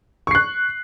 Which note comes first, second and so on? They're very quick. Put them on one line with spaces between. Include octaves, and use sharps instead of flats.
C#6 C7 F#6